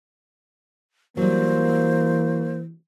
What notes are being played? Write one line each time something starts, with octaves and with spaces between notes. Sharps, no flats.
E3 F#3 G3 A#3 C5